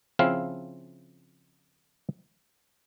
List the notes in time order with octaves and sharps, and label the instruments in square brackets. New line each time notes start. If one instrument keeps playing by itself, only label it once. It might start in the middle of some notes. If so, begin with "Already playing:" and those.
[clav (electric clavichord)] C#3 F3 C4 E4 F5